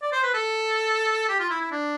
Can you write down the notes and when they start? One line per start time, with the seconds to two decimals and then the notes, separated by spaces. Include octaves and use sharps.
0.02 D5
0.12 C5
0.23 B4
0.34 A4
1.29 G4
1.40 F4
1.50 E4
1.61 E4
1.71 D4